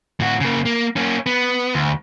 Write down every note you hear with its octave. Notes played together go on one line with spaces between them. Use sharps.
A2 F#4
C#3 A#3
A#3
A#3 C#4
B3
D2